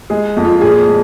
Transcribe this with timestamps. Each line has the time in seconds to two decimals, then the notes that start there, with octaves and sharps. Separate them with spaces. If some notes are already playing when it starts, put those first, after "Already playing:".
0.10 G#3 G#4
0.37 F2
0.45 F4
0.61 A#2 G#4
0.87 G#3